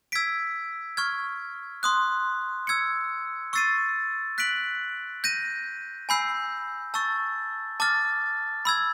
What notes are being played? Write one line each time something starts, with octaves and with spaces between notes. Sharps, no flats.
E6 G#6 B6 D7
C#6 F6 G#6
C6 D#6 F#6
E6 G#6 C#7
C#6 E6 A6 C7 D#7
F#6 B6 D7 F#7
G6 A#6 D#7
G#5 B5 E6 G6 C7
A5 C#6 E6 A6
A5 D6 F6 A6
B5 E6 G#6